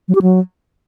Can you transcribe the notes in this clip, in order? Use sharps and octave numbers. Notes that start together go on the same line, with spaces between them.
F#3
G4
F#3